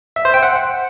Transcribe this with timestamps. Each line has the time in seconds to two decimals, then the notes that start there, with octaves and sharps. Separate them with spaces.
0.16 E5
0.25 C5
0.34 G5
0.43 F#5